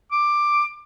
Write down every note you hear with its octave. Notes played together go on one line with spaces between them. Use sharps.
D6